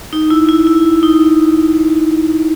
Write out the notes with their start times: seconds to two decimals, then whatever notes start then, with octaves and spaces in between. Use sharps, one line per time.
0.13 D#4
0.30 E4
0.49 E4
0.67 E4
1.03 D#4